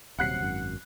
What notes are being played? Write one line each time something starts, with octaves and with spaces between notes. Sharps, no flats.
D#1 C3 F#3 F#5 F#6 C7
G#1 F#2